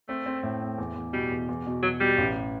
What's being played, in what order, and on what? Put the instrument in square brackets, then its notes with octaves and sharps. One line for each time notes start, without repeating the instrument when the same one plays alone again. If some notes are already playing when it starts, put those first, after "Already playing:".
[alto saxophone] A3 [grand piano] C4
[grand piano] C4
A2
C4
E2
E2
[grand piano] B2 [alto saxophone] G3
[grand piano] E2
E2
B2
[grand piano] E2 [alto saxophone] F#3
[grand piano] B2 [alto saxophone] G3
[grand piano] A1